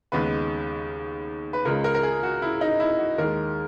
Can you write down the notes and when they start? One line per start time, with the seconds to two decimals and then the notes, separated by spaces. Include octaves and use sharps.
0.12 D#2 C#3 G#3 B3 B4
1.53 B4
1.65 C#2 C#3 G#3 A#4
1.84 A#4
1.95 A#4
2.03 G#4
2.23 F#4
2.42 E4
2.61 D#4
2.80 E4
2.98 F#4
3.18 D#2 D#3 G#3 A#4